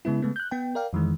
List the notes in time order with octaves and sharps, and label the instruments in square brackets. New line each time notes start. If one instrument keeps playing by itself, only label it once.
[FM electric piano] C#3 G#3 B3 E4
C#3 G#3 A3 B3
F#6 G6
B3 G5
A#4 D5 F5 G5
F2 D#3 E3 G#3